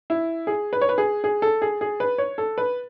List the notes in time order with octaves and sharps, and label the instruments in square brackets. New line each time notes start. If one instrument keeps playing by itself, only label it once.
[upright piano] E4
G#4
B4
C#5
B4
G#4
G#4
A4
G#4
G#4
B4
C#5
A4
B4